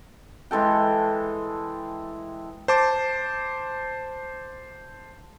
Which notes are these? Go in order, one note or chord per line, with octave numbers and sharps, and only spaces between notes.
E3 G#3 A4 G5
C5 A5 D6